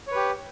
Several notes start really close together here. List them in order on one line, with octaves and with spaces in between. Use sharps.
C#5 B4 G4